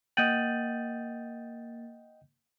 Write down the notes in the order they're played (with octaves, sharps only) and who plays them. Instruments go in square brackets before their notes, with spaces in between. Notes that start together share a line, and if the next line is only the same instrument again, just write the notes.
[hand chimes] A#3 A6 [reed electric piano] D#5 F#5 G5 [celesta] G6 D#7 F#7